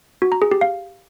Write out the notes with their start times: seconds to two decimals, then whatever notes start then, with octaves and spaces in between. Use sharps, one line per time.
0.22 F#4
0.32 A#5
0.42 G#4
0.51 G4
0.61 F5